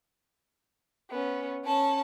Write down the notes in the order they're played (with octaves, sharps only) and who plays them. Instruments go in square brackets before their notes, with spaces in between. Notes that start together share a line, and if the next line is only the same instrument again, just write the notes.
[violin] B3 C#4
C#4 A5